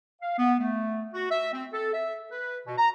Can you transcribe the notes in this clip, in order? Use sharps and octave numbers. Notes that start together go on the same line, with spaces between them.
F5
B3
A3
F#4
E5
C4
A4
E5
B4
B2
A#5